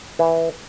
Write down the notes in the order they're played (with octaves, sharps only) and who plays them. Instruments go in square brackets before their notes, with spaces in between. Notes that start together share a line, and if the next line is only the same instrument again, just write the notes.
[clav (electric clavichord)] E3